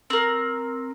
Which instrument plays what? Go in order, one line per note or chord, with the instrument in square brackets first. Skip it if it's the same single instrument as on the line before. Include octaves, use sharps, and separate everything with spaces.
[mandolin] C4 A#4